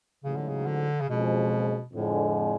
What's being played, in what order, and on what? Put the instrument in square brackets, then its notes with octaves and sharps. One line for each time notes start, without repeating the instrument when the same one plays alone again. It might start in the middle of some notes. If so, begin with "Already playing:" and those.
[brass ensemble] A1 G#2 F#3 [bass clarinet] C#3
[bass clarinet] D3
C#3
D3
C#3
[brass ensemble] F#1 F2 F3 G#3 [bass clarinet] B2
[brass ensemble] F2 D3 G#3 [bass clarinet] A2